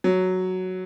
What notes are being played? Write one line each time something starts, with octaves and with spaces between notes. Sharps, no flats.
F#3